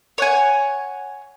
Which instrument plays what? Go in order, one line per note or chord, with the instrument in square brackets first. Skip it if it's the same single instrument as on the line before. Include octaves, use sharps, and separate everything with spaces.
[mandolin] C#5 F#5 G#5